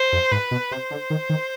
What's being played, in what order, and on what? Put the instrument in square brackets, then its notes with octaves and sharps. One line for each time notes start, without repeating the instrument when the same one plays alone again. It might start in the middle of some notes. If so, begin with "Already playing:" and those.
Already playing: [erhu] C5
[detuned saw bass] F2
[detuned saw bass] G#2 [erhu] B4
[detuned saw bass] B2
[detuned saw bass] C3 [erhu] C5
[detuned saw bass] D3
D#3
D#3